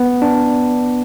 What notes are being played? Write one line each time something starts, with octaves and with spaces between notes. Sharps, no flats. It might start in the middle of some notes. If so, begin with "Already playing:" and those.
Already playing: B3
D4